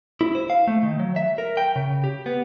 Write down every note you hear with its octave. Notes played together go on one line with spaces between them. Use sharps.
E4
C5
F5
A3
D#3
F#3
E5
A#4
G5
C#3
G4
B3